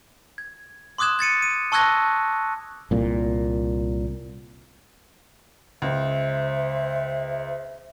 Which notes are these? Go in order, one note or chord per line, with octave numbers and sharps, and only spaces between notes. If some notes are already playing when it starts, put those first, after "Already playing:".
G#6
C6 D6 D#6 F#6 G#6 E7
G#6 A6 C#7 D#7
D#7
A5 C#6 E6 F#6 G#6 A#6
C2 A#2
C#2 C5 E5